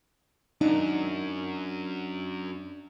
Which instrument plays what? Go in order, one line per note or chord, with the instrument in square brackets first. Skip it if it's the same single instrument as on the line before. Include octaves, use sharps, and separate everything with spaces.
[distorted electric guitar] F#2 [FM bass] D4 [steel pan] D#4